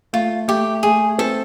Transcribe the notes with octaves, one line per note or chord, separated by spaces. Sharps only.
A3 F4
A3 G4
A3 G#4
C4 A4